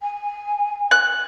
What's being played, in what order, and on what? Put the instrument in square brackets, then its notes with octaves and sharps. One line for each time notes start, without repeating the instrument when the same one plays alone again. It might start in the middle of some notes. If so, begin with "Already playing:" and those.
[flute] G#5
[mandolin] F#6